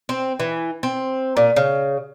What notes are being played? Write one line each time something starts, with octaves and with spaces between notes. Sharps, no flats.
C4
E3
C4
A#2
C#3